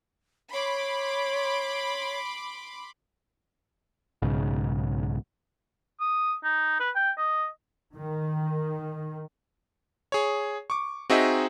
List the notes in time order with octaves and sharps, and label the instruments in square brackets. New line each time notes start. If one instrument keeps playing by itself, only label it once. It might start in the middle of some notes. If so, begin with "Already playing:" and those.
[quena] C#5 [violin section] B5 C6 D6
[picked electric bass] B1 G#2 C#3
[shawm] D#6
D#4
B4
G5
D#5
[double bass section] D#3
[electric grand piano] G#4 C#5
C#6 D6
C4 D#4 F#4 G#4 D#5 E5